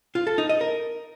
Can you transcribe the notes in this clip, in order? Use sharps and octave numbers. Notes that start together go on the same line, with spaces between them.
F4
A4
D#4
D#5
A#4